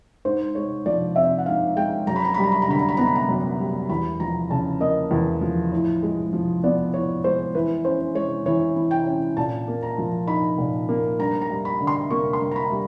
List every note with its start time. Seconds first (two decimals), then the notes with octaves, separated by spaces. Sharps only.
0.25 G#2 C5
0.55 G#3 C#5
0.86 F3 D5
1.16 C4 E5
1.38 F#5
1.46 G#2 F5
1.76 G#3 G5
2.07 F#2 A#5
2.16 B5
2.25 A#5
2.34 G3 B5
2.44 A#5
2.52 B5
2.62 A#5
2.68 D3 B5
2.79 A#5
2.89 B5
2.97 B3 A#5
3.06 B5
3.15 A#5
3.28 F#2
3.59 G3
3.89 E2 B5
4.20 F3 A#5
4.50 C#3 A5
4.80 A#3 D#5
5.11 E2
5.41 F3
5.72 A2
6.03 G#3
6.33 F3
6.64 B3 D5
6.94 A2 C#5
7.24 G#3 C5
7.54 E3 B4
7.85 C#4 C5
8.15 G#3 C#5
8.46 E3 C#5
8.76 E3
8.91 G5
9.06 C#4
9.37 A#2 A5
9.68 A#3
9.83 A#5
9.98 F3
10.27 D#4 B5
10.58 A#2
10.89 A#3
11.19 G2 A#5
11.41 A#5
11.50 G3
11.65 B5
11.81 D3
11.87 C6
12.10 A#3 C#6
12.33 C6
12.41 G2
12.51 A#5
12.56 B5
12.71 G3